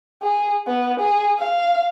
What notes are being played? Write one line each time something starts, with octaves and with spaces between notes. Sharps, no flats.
G#4
B3
G#4
F5